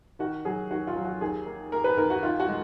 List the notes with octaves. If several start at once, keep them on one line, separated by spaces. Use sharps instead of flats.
D#3 F#4
F#3 G#4
D#2 F#4
F4
F#3
F#4
D#2 G#4
A#3
A#3 A#4
B4
D#2 A#4
F#4
D#3 F4
F#4
G#3